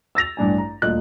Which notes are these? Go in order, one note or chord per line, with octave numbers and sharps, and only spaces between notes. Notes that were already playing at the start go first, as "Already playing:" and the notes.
E6 A6 A#6 F7
A1 G2 D4 G#5
A#5
D#1 D2 F4 D#5 F#6